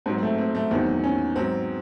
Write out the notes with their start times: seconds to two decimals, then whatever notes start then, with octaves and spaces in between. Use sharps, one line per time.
0.06 G#2 F#3 C4
0.18 C4
0.22 A3
0.38 C4
0.55 A3
0.71 E2 D#3 F#3 C4
1.04 C#4
1.36 G#2 F#3 C4